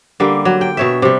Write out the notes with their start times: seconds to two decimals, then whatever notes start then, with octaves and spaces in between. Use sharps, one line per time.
0.20 D3 G3 A#3
0.45 F#3
0.61 G5
0.77 B2 C#5 E5
1.02 C3 G3